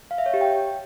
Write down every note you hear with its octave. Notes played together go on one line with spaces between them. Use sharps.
F5
E5
C#5
G4
G5